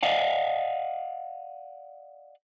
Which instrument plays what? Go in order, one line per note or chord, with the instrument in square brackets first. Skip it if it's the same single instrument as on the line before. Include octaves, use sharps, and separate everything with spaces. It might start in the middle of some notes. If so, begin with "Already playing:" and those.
[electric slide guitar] D5 D#5 F5 F#5